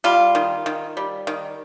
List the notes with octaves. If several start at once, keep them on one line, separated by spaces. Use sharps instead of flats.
G3 F4
D#3
D#3
G3
D#3